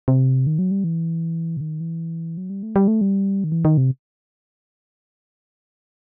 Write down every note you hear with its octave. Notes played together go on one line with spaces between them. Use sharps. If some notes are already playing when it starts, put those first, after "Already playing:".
C3
D#3
F#3
G3
E3
C3
D#3
E3
F#3
G3
A3
G3
A3
G3
D#3
E3
D#3
C3